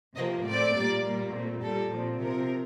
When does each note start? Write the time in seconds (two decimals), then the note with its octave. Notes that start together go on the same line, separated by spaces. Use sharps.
0.16 C3 F3 A#3 D#5
0.45 A2 A3 C4 D5
0.75 A#2 G3 A#3
1.03 A#2 G3 A#3
1.33 A#2 A3 C4
1.62 A#2 G3 A#3 A4
1.91 A#2 F3 C4
2.20 C3 F3 C4 A#4